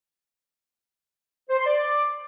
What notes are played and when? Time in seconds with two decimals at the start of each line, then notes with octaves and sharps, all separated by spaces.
1.50 C5
1.58 C6
1.66 D5